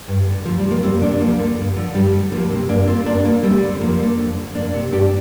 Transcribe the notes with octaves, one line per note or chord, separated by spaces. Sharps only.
G2
D3
D2 F3
G3
C3
F3 A#3
F2 G3 C4
C3 A#3 D4
D2 F3 A#3
D3
G2
D3 F3
G2 G3
D3
D2 F3 A#3
C3
G2 A#3 D4
D3 C4 F4
G2 A#3 D4
D3 A#3 D4
D2 G3 C4
D3
F2 F3 A#3
D3
F2
D3
F2 A#3 D4
C3
G2 D4 G4